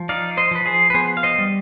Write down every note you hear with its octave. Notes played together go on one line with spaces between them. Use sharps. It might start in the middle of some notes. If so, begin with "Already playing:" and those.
Already playing: F3
D#4 D5 F5
C5 D#5
F3 B4
G#4 C5
B4
B3 G#4 C5
F5
C5 D#5
G3